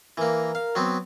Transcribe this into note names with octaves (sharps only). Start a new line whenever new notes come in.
E3 A#3 A#4
F5
F#3 B3 C4